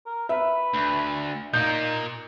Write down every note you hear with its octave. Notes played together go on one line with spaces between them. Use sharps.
A#4
B4 E5
D2
A#2 A#3 D#4 G6